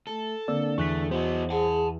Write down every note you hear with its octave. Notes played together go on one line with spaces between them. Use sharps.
A3 A4
D3 A#3 C4 D5 E6
E2 A3 C#6 F#6 B6
B3 D#4 F#4 C5
G#4 F#5 A5